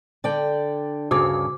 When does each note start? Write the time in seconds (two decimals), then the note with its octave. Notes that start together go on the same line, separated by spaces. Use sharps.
0.24 D3 D5 G5
1.11 D2 G2 C#3 F#4 D6